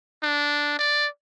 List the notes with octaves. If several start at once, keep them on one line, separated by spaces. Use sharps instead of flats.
D4
D5